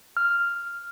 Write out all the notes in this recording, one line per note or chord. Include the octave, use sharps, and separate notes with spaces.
F6